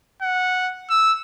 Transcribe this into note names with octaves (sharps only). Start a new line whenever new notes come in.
F#5
E6